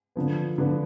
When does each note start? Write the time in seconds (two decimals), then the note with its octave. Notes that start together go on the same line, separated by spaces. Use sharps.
0.16 D3 F3 B3
0.58 D3 F3 B3